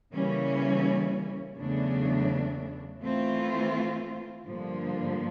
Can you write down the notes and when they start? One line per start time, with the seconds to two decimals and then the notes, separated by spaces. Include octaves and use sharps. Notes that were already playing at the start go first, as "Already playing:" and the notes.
0.13 C#3 E3 G3 A#3 C#4
1.57 E2 C#3 F#3 A3 D4
3.01 E3 A3 C4 F4
4.46 G2 D3 F3 A#3